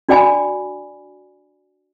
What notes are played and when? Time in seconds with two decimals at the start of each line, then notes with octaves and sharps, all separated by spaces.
0.09 D4 F#4 D5 G5 G#5 B5